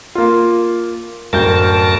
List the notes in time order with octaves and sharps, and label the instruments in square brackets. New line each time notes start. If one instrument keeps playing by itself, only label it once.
[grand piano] A#3 F4
[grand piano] D1 G6 [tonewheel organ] F#2 A#4 A5